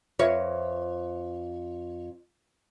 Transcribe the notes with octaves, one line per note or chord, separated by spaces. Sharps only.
F2 F4 B4 C#5 E5